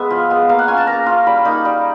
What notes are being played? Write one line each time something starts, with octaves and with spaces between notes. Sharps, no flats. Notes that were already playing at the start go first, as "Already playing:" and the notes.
Already playing: G#3 B3 E5
F3
G#3 B3
A#3 F5
F#5
C#4 F4 G#5
A5
A#3 A#5
C#4 F4
G3 B5
A#3 D#4
G3